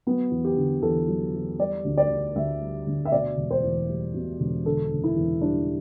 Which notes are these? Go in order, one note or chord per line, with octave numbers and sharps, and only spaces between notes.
F#3 B3
E2
G4
D3
E2 A4
F#3
E2
G3 D5
D2
D5
D3
D2 E5
G3
D2
E5
B2 D5
E1
C5
E2
G3
B2
E1
D3 A4
F#1
E4
E2
G3 D4